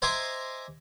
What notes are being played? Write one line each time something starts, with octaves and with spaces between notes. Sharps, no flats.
C5 D#5 E5 G#5 A#5 D6